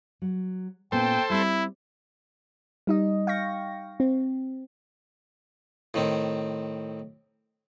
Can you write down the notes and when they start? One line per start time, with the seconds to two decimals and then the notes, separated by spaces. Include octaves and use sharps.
0.22 F#3
0.92 A#2 B3 C#4 A4 C5 G5
1.30 G3 C4 E4
2.87 G3 D#4 D#5
3.27 F5 G5 C#6 A#6
4.00 C4
5.94 A2 D#3 C4